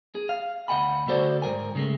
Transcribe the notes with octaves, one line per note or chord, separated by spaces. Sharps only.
G#4
F5
D2 D#5 F#5 G#5 B5
D3 A3 F#4 A4 C5 D5
G#2 C#3 A#4 G#5
C#3 G#3 A3